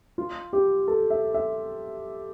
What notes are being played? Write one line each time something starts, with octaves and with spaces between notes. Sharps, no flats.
F4
G4
A4
E5
E5